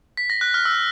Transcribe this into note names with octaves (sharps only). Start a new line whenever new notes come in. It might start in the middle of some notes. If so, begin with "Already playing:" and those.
B6
A#6
F#6
F6
E6